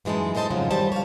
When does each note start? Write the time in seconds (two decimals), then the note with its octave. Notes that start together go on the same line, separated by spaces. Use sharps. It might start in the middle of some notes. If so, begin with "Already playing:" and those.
0.05 F#2 E3 G#3 D#4 A5
0.35 A4 A#4 C5 D#5 A5
0.51 F2 G#2 C#3 F3 F#3
0.71 D#3 G3 C5 A5
0.92 C#5 F5